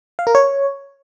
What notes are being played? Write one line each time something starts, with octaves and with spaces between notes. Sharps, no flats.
F5
A#4
C#5